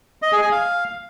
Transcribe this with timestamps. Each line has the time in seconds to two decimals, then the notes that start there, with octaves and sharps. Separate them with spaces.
0.22 D#5
0.32 G#4
0.42 G#5
0.52 F5